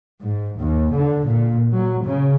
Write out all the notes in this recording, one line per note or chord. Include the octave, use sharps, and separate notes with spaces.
G#2
D#2
D3
A#2
F#3
C#3